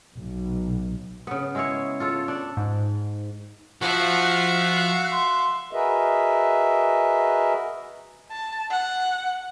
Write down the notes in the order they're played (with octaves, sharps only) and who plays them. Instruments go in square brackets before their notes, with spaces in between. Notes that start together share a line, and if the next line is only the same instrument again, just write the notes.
[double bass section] B1
[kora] C#3 B3
G#3 E4 C#5
F4 A4 C#5
D4
[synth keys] G#2
[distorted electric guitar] F3 F4 [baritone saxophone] F#4 [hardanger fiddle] E5 F5 [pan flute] F#6
[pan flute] C6
[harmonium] F#4 G#4 A#4 B4 D#5 E5
[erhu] A5
F#5